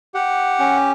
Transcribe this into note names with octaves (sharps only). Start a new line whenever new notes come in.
G4 F#5
C#4